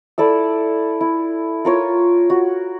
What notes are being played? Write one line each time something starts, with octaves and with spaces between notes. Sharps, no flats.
E4 A4 D5 E6
E4
F4 A#4 C#5
F#4